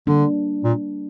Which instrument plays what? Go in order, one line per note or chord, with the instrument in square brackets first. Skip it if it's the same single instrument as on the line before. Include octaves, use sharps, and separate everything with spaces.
[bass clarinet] D3 [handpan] G3 A#3 D4
[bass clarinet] A#2